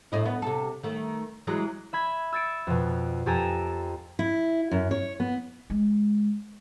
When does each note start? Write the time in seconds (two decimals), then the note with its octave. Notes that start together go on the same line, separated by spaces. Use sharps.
0.12 A2 D#4 E4
0.25 B3
0.42 C3 A4
0.83 D#3 A3
1.47 E3 F#3 G#3
1.93 E5 B5 G#6
2.33 E6 G#6 A6 C#7 D7 E7
2.67 F2 B2
3.26 F2 G4 A4 G#5 A#5 E7
4.19 E4
4.71 F#2
4.91 C#5
5.20 B3
5.70 G#3